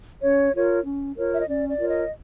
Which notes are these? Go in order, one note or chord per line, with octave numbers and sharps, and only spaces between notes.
C#4 C#5
F4 A#4 C#5
C#4
F4 A#4 C#5
E5
D#5
C#4 D5
D5
F4 A#4 C#5
D#5